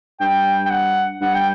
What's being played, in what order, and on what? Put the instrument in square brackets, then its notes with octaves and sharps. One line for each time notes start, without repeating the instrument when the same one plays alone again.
[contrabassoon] G2 [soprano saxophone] G5
[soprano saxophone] G5
F#5
[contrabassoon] G2 [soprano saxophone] F#5
[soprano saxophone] G5